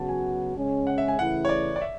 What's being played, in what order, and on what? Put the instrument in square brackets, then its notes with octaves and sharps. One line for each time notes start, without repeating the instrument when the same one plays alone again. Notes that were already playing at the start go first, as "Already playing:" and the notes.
Already playing: [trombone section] C#3 F#3 B3 F#4 [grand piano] A5
[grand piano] G#5
[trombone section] C#3 G#3 C#4
[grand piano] F#5
E5
G#5
[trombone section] C#3 E3 A3 E4 [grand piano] F#5
[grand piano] C#5
D5
D5
E5